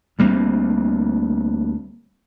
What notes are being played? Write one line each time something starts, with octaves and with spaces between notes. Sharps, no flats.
D2 G3 A#3 C4